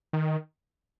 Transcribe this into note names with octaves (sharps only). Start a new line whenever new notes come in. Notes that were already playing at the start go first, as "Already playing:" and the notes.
D#3